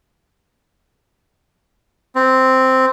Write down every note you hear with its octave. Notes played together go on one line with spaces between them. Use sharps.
C4